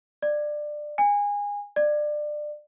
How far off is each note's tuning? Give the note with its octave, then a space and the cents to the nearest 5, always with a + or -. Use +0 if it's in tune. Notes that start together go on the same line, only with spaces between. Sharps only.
D5 +20
G#5 -25
D5 +25